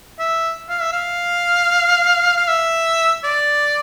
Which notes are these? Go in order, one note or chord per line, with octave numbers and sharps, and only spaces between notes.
E5
F5
E5
F5
F5
E5
D5